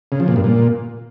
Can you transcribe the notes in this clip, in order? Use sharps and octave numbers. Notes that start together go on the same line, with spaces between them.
C#3
F3
A#2
G2
A#2